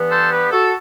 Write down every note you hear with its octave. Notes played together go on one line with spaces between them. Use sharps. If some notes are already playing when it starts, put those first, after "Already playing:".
Already playing: G2 E3 B3
A4 C5
G4 B4
F#4 A4